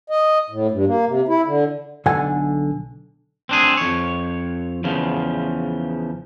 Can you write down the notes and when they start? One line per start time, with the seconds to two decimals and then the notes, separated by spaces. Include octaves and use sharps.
0.10 D#5
0.50 A2
0.71 G2
0.86 A#3
1.06 C3
1.28 E4
1.45 D3
2.06 B1 D3 D4 A4 F#5 G#5
3.49 C4 D4 G#4
3.77 F2 C#5
4.84 E2 C#3 F3